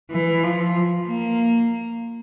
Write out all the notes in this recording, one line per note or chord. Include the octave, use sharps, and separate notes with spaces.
E3
F3
A#3